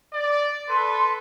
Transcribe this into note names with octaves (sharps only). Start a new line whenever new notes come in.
D5
A4 B4 C6